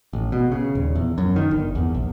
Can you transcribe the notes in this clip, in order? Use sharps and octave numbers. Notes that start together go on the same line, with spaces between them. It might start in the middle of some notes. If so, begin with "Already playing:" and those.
A1
B2
C#3
D#1
E2
F#2
D#3
G1
E2
A#1